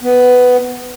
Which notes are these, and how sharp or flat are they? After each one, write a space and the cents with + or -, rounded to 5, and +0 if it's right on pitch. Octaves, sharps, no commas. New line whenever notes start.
B3 +10